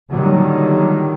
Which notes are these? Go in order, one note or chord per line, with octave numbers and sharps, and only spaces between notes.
A#2 D3 D#3 F#3 G3 A#3